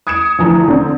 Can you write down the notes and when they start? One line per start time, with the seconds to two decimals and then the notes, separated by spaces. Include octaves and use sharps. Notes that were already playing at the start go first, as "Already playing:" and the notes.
0.07 D#6 G#6 C#7 D7 E7
0.39 D2 E3 F3 A#5
0.68 D3 C4